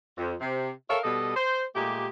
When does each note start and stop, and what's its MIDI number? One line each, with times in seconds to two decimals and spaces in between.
0.18 0.34 41
0.40 0.70 48
0.89 0.98 69
0.89 0.98 70
0.89 0.98 73
0.89 0.98 76
0.89 0.98 77
1.04 1.35 47
1.04 1.35 55
1.04 1.35 69
1.04 1.35 75
1.36 1.63 72
1.75 2.07 46
1.75 2.07 56
1.75 2.07 57
1.75 2.07 67